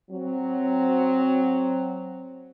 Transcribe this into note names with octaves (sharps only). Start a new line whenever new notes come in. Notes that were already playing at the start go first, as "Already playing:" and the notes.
F#3 C4